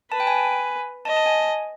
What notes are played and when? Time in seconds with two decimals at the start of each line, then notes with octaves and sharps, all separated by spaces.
0.11 B4 A5
0.20 G5
0.27 G#5
1.05 D#5 A5
1.17 A5
1.26 G#5